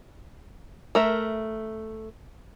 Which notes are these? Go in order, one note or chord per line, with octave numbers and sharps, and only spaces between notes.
A3 A#4 E5